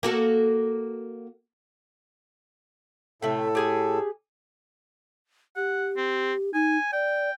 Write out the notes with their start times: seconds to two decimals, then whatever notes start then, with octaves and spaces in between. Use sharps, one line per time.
0.03 A#3 F#4 A4
3.22 A2 C3 A3 A4
3.55 G4 G#4 G#5
5.56 G4 F#5
5.97 C4
6.54 D#4 G#5
6.93 D5 G5